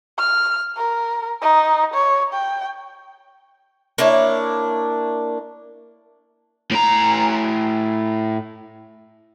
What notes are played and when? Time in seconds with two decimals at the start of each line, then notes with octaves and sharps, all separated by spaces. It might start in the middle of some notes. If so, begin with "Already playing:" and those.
0.19 F6
0.77 A#4
1.42 D#4
1.94 C#5
2.33 G5
3.98 A#3 D4 E4 C#5
6.71 A2 A#5